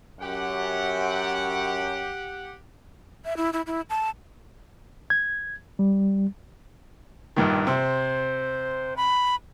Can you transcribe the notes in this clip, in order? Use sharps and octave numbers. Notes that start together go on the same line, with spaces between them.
F#2 G4 F#5
E5
E4
E4
E4
A5
G#6
G3
A#1 G2 D#3
C3 C5
B5